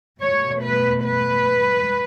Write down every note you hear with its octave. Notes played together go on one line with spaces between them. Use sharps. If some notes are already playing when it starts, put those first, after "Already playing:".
B2 A3 C#5
B4
B4